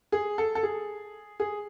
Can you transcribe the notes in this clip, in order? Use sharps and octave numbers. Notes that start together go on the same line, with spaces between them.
G#4
A4
A4
G#4
G#4